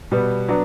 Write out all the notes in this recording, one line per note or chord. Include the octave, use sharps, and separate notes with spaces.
B2 G3 B3
F#3 B3 D4